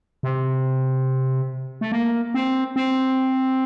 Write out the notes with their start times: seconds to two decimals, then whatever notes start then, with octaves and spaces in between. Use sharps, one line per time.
0.23 C3
1.81 A3
1.92 A#3
2.34 C4
2.76 C4